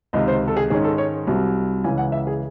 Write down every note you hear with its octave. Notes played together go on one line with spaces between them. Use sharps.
C#2 C3 D#3 D#5
C5
A4
G#4
G#2 D#3 G#3 C#4 G#4
A4
C#5
C2 C3 F#3
C#2 C#3 E3 G#5
F#5
E5
G#4